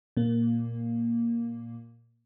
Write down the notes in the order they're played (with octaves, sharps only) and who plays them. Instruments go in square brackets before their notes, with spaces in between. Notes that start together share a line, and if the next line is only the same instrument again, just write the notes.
[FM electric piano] A#2 A#3